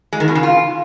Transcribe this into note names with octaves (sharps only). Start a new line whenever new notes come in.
G#3
D#3
B2
C#3
F4